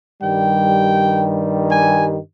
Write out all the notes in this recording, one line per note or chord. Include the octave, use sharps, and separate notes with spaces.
G2 D#3 G3 G5
G#5